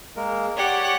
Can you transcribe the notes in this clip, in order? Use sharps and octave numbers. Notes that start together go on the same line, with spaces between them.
G#3 A#3 A#4
G4 C#5 D5 F#5 C#6